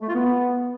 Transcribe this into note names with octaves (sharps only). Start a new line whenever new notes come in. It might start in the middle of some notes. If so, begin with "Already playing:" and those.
A3
F4
B3